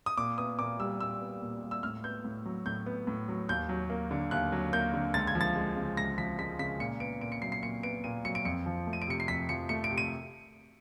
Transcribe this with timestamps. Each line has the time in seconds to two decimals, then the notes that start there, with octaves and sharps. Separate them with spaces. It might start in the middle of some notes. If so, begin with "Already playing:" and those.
0.06 D#6
0.17 A#2 D6
0.38 B3 D#6
0.59 A#2 D6
0.79 G3 E6
1.00 A#2 E6
1.21 B3
1.42 A#2
1.62 G3
1.71 E6
1.83 A2 F6
2.04 B3 G6
2.24 A2
2.45 F#3
2.66 A2 G6
2.86 B3
3.07 A2
3.28 F#3
3.49 D#2 G6
3.69 F#3
3.90 A#3
4.11 D3
4.31 D#2 F#6
4.52 F#3
4.73 A#3 G6
4.94 D3
5.14 C#2 A6
5.27 G#6
5.35 F3
5.41 A6
5.56 G#3
5.76 C#3
5.97 C#2 A#6
6.18 F3 B6
6.39 G#3 B6
6.59 C#3 B6
6.80 A#2 C#7
7.00 B3 D7
7.21 A#2 D7
7.32 C#7
7.42 F#3 C7
7.52 C7
7.63 A#2 C#7
7.83 B3 D7
8.04 A#2 D#7
8.25 F#3 C#7
8.35 D7
8.45 F2 C#7
8.66 F3
8.87 A3
8.93 D#7
9.02 D7
9.07 C3 C#7
9.20 C7
9.28 F2 B6
9.49 F3 C#7
9.69 A3 C#7
9.84 D7
9.90 C3
9.98 D#7